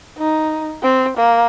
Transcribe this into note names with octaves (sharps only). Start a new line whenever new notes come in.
D#4
C4
A#3